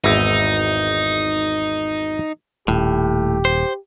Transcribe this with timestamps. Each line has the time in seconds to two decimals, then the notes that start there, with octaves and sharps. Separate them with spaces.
0.04 G#1 E2 D#4 E4
2.68 D#1 A2 G4
3.45 C5